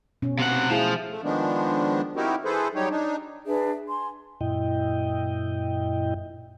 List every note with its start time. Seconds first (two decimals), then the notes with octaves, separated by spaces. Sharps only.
0.22 B2 C#4
0.39 C3 F#5
0.70 F3 A3 E4 G#4
1.10 A3
1.24 D#3 F3 G#3 B3 D4
2.17 C4 D#4 E4 F#4 G4 A#4
2.45 E3 G#4 A4 B4 C5
2.75 F#3 G3 D#4 G4 C#5
2.91 D4 D#4
3.46 D4 G#4 B4 E5
3.87 G#5 C6
4.41 F#2 A#2 E4 D#5 G5